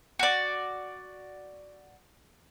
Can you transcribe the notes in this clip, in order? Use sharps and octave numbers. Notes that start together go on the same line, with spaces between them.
F#4 D5